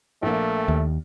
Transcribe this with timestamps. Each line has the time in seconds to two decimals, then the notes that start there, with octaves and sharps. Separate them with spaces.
0.22 A#1 A3 A#3
0.68 D#2